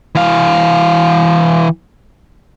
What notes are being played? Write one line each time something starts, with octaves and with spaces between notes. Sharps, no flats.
E3 F5